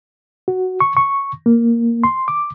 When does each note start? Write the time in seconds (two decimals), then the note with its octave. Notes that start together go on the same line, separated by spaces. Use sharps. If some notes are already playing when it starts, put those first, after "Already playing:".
0.48 F#4
0.80 C#6
0.97 C#6
1.46 A#3
2.04 C6
2.28 D6